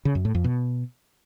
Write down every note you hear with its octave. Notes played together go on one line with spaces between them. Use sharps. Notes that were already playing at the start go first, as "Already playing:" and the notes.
C#3
F#2
A2
F2
B2